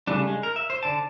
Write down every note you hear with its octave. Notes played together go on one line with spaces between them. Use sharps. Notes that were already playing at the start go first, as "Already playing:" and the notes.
C#3 G3 A3 D4
G#3
A#4
E5
C5
D3 D5 A5